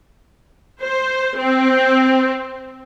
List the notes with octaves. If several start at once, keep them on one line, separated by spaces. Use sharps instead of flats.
C5
C4